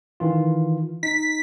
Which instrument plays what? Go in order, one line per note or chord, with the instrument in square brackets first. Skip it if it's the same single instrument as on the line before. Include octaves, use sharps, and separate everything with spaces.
[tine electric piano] D#3 E3 F4
[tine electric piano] D#4 [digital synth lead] B6